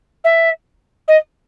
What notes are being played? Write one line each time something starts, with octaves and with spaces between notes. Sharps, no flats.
E5
D#5